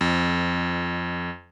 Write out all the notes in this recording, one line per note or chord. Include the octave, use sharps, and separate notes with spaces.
F2